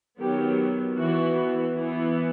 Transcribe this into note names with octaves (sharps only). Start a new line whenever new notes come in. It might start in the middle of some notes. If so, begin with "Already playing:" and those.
D#3 F#3 B3 G4
E3 B3 F#4
E3 B3